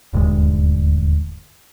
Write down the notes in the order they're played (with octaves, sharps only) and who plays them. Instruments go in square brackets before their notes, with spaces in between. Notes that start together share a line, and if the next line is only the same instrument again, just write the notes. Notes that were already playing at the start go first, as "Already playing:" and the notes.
[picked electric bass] D#1 D2 G2 G#3